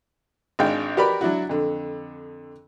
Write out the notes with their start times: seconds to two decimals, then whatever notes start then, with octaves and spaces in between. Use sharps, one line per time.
0.59 G#1 G#2 D4 F5 G5
0.97 F#4 G4 A#4 B4 D5 B5
1.21 F#3 D4 E4 F#4
1.49 F2 D3